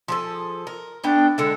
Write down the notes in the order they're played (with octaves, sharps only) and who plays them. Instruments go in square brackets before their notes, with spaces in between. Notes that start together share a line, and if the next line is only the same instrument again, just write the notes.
[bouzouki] F3 G#4 A4
A#4
[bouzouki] A3 B3 G5 [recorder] D4
[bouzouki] D3 G#3 E4 [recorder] A4